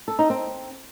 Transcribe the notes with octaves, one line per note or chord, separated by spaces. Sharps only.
A4
D#4
C4